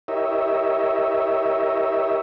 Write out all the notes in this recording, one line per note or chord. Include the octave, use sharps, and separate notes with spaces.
E4 G4 A#4 C#5 D#5 E5